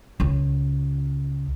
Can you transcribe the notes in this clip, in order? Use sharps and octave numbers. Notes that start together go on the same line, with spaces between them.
C#2